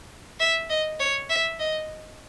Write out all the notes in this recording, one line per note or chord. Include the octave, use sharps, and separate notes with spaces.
E5
D#5
C#5
E5
D#5